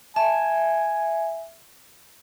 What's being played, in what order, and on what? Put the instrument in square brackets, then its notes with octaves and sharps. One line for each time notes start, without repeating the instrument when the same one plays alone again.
[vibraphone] E5 [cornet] G#5 [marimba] A5